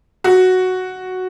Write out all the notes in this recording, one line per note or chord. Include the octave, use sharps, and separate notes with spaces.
F#4